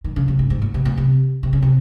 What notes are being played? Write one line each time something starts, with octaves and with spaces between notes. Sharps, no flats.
D#3
C#3
C3
G#2
G#2
A#2
C3
A#2
C3
C3
C#3
C3